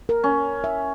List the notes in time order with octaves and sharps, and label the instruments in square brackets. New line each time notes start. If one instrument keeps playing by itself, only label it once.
[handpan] A#4
[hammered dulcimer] C#4
[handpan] E5